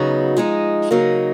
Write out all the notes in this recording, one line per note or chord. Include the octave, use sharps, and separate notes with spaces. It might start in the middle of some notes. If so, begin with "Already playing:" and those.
Already playing: C#3 F#3 B3 D#4 F#4
F3 G#3 D#4
C#3 F#3 A#3 D#4